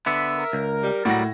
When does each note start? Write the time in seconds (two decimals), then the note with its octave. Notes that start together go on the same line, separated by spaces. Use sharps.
0.06 D3 B3 E5
0.36 A#4
0.53 C#2
0.83 G3
1.05 A2 F#3 G3 F#4 F#5 A#6